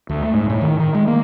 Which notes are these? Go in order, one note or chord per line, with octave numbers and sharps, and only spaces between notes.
D2
A3
G#2
A2
D#3
D#3
G#3
A#3